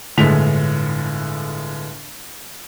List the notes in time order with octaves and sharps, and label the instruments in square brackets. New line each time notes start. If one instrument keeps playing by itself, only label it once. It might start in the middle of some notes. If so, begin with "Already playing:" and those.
[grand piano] G1 A2 D3 G#3 B6 F7